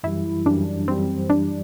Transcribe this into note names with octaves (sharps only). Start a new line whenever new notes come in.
F#2 E3 G3 E4
F#2 E3 G3 D4
F#2 E3 G3 C4
F#2 E3 G3 D4